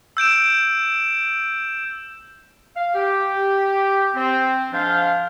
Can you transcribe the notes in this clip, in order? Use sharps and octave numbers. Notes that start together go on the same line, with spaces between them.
E6 G6 D7 E7
F5
G4
C4
G#2 F3 D4 C5 F5